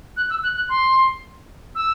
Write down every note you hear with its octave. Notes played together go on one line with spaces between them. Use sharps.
F#6
E6
F#6
F#6
C6
E6